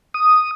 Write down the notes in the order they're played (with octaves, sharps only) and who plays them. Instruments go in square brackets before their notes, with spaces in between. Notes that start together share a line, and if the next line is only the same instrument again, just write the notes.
[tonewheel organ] D#6